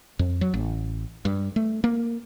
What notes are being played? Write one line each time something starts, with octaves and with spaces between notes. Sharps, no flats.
F2
F#3
A1
G2
A3
A#3